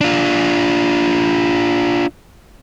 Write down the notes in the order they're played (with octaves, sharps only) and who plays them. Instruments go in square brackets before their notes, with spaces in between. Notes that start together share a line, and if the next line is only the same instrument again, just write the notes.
[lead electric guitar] D4 F4